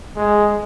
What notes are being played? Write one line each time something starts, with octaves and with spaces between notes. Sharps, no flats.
G#3